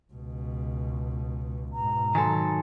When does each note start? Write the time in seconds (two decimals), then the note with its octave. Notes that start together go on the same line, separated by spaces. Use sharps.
0.13 C#2 B2
1.73 G#2 B2 A#5
2.15 D#3 F#3 A4 G#5 C6